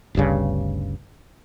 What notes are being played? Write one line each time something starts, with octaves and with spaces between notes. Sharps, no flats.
G1 D2 G2 C#3